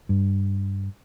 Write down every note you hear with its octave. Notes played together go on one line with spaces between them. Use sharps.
G2